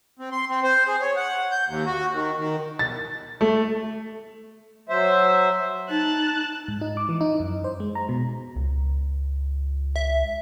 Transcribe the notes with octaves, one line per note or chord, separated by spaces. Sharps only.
C4
C6
C4
C5
G#4
C#5
F#5
G6
D#2
F#4
D#3
D#3
A6
A3
F#3 C5 E5
D#4 A5 F#6
G#2
D#4
D6
E3
D#4
F#2
C5
G#3
A#5
B2
C#2
E5